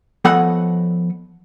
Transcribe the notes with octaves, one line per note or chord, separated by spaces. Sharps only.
F3 B3 A4 C#5 D#5 F#5